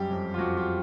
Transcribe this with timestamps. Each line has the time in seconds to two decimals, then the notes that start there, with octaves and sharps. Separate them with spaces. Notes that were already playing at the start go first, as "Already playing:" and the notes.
Already playing: F#2 G3 G4
0.10 F2
0.34 F4
0.38 F2 F#4
0.57 F4